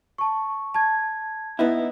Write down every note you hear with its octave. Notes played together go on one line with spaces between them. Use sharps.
A5 C#6
A5 G#6
B3 D#4 E4